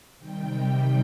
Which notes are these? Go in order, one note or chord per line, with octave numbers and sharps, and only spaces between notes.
C3 D#3 G3 G5